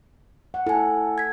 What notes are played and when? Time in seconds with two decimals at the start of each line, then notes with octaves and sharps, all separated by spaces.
0.54 F#5
0.67 E4 A4 G#5
1.18 G#6 B6